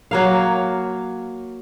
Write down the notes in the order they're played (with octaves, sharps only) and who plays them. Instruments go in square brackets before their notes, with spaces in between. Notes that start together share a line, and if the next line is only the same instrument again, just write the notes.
[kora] F#3 A#3 F5